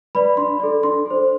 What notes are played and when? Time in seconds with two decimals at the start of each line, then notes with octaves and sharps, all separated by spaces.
0.15 B4 D5 B5
0.37 D4 C6
0.60 A4 D5
0.83 D4 C6
1.06 A4 C5